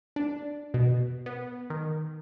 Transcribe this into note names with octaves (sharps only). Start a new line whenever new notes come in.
D4
B2
B3
D#3